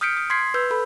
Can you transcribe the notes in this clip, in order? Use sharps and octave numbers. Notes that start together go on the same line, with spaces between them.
D#6 F6 G6 B6 C#7 D7
D#6
C6 G#6 B6 C7
B4 E6 G6
A4 B5